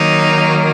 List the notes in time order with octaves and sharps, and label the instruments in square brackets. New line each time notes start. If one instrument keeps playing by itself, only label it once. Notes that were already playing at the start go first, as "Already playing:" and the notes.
Already playing: [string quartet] D#3 F#3 A#3 D#4